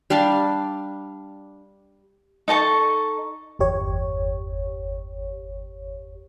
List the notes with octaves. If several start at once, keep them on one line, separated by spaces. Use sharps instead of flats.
G3 D4 F5 A5
D#4 A4 A5 C#6
G1 E2 G4 C#5